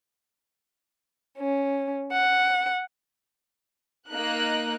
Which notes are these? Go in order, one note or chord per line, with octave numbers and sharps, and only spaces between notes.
C#4
F#5
A#3 D#4 A#4 F#6